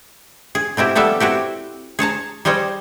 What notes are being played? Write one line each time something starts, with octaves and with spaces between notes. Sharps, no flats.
G#4
B2 C4 E4 G4
F3 G3 B3 A4 E5
C4 E4 F#4 G4
G#4 C#5 A5 A#5
G3 G#4 C5 C#5 D#5